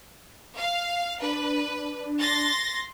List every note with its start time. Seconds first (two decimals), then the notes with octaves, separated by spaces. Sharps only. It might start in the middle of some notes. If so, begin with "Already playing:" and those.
0.57 F5
1.22 D4 B4
2.21 C6 A6 A#6